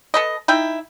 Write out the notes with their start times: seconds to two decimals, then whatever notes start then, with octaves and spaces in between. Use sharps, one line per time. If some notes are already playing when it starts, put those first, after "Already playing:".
0.14 A4 B4 D#5
0.48 D#4 E4 G5